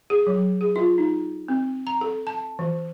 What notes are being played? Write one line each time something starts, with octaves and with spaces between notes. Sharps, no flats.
G#4
F#3
G#4
F4
D#4
C4
A#5
A4
A5
E3